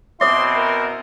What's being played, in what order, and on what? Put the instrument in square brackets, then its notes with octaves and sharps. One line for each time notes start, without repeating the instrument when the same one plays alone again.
[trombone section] B2 C4 E4 [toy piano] C5 E5 [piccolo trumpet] C6 [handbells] D6 D#6
[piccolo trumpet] A#4